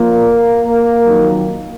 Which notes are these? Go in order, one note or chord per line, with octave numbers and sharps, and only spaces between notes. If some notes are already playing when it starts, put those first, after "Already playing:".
Already playing: A#2 F3 A#3
F2 D#3 F#3